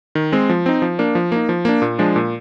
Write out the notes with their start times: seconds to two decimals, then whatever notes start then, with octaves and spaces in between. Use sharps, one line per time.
0.15 D#3
0.32 G#3 C4
0.50 F3
0.66 C4 D#4
0.82 F3
0.99 A#3 D4
1.15 F3
1.32 A#3 D#4
1.49 F3
1.65 A#3 D4
1.82 A#2
1.99 F3 G#3 D4
2.16 A#2